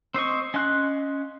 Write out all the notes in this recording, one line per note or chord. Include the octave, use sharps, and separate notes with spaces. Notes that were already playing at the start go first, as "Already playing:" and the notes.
C4 C5 D#5 C#6
C#4 D#5 F5 C6 F#6